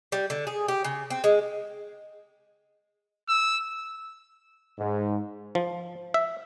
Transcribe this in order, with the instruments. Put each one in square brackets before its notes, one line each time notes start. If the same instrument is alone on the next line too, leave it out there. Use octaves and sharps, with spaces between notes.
[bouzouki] G3
D3
G#4
G4
C#3
C4
G#3
[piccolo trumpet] E6
[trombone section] G#2
[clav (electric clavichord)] F3
E5